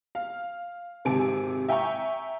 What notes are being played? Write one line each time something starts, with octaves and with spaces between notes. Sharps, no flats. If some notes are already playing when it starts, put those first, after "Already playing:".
F5
G#1 C3 G#5 A5 D7
E5 G5 G#5 A#5 C#6